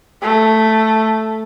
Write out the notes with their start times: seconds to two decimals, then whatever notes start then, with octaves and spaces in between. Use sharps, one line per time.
0.22 A3